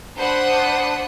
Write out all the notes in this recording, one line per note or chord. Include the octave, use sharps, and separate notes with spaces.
D4 C5 F#5 B5 D#6